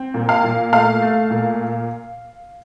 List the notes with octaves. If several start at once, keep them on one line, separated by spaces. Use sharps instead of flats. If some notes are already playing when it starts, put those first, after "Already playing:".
Already playing: C4
A#2
F5
A#2
A3 F5
A3
A#2